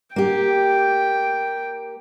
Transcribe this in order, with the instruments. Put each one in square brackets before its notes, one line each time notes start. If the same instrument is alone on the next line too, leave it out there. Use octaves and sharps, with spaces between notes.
[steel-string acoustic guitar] A#3 G4 [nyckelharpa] G5